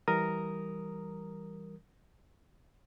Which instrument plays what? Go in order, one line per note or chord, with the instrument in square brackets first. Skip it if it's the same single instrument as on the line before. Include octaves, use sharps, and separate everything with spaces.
[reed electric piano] E3 G3 A#4 A#5 D#6